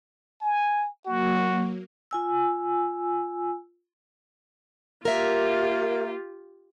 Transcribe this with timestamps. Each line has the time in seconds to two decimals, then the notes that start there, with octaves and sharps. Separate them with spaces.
0.41 G#5
1.06 F#3 A#3 F#4
2.11 F4 G#5 E6
5.05 A#3 F4 G4 A#4 E5